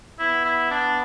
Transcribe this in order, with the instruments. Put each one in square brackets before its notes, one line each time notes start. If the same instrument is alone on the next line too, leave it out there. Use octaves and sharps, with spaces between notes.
[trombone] B3 [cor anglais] E4
[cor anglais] E4
D4